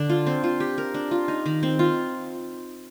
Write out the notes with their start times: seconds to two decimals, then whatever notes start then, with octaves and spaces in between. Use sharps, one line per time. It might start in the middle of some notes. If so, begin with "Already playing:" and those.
Already playing: D3 D4
0.09 F4
0.26 C4
0.44 F4
0.60 G4
0.78 A#4
0.94 D4
1.11 F4
1.28 D#4
1.46 D#3
1.63 C4
1.79 F4